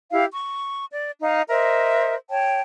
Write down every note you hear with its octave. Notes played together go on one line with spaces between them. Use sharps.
E4 G4 F5
C#6
D5
D#4 F5
A#4 C5 D#5 E5
C#5 G5 A5